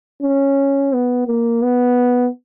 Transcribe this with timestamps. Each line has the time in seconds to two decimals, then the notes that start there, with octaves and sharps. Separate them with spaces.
0.23 C#4
0.93 B3
1.28 A#3
1.63 B3